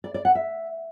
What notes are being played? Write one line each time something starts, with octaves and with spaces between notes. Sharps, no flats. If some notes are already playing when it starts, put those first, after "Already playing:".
D5
D5
F#5
E5